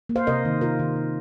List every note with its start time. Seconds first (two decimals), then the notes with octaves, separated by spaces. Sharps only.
0.09 A#3
0.16 C5 F5
0.27 C3 A#4 D#5
0.45 D#3 A#3
0.61 C3 F4 A#4
0.79 D#3 A#3
0.96 C3